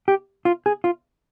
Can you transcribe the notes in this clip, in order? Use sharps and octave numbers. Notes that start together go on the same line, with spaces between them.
G4
F4
G#4
F4